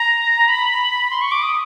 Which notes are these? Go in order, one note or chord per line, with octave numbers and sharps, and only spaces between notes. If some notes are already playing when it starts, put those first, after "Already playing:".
Already playing: A#5
B5
C6
C#6
D6
D#6